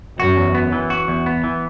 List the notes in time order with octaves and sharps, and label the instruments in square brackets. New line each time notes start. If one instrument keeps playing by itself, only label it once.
[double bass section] F#2 [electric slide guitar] F#4
[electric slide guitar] E2
B3
E3
F#4
E2
B3
E3